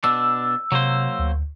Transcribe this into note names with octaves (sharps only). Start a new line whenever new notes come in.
B2 D4 E6
C3 F#3 A#3 C5
D2